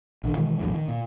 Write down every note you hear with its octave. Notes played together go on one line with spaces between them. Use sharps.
A#1 D3 D#3
B2 D#3 E3 G#3
A#1 E2 A2 F#3
D#3
A#2